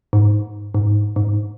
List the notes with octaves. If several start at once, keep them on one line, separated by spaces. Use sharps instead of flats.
G#2
G#2
G#2